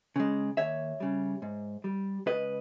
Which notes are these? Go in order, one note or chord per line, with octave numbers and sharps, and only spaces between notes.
C#3 G#3
D#2 C#5 E5
C#3 G3
G#2
G3
C#2 B4 D#5